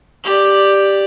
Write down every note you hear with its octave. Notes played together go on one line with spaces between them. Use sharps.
G4 D5